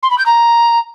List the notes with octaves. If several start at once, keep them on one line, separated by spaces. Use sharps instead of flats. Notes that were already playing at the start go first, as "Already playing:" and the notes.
C6
B5
G6
A#5